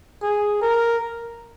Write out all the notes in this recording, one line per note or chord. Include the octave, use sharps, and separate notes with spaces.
G#4
A#4